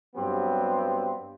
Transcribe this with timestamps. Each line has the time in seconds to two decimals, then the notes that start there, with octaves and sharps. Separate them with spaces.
0.15 G2 F#3 B3 C4 G4